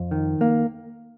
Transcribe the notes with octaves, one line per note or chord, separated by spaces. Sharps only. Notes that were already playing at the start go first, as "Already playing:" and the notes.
Already playing: F2
D#3
A#3